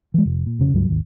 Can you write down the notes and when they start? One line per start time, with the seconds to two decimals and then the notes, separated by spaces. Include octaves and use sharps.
0.14 E3 G#3
0.25 F1
0.46 A#2
0.59 F1 C#3
0.74 C#2 G2 F#3
0.88 G#1 D#2